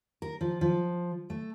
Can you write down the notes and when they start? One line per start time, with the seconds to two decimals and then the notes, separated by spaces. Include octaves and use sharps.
0.22 A#4
0.41 F3
0.61 F3
1.30 A3